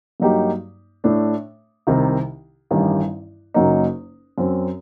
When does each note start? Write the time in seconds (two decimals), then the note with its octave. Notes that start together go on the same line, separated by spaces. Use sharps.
0.20 G2 F#3 A#3 D#4 G4
1.04 A2 A3 D4
1.87 C2 C3 D#3
2.71 A1 G2 D#3 G3
3.54 F#1 F#2 F#3 A#3 D#4
4.38 F#2 F#3 C4